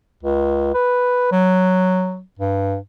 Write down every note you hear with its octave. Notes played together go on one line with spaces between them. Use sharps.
C#2
B4
F#3
G2